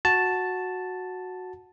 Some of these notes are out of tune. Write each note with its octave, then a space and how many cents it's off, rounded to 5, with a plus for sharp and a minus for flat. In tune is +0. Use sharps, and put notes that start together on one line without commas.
F#4 -10 A5 +0